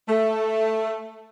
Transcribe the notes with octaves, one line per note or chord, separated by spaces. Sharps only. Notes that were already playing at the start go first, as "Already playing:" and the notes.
A3